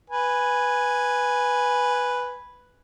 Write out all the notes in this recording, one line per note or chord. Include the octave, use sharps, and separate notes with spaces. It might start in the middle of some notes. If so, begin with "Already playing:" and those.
B4 G#5